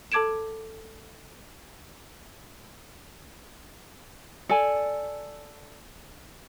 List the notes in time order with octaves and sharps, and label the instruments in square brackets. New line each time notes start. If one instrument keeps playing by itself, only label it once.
[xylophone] A4 A5 D6 G#6 D7 E7
[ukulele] A4 D5 G#5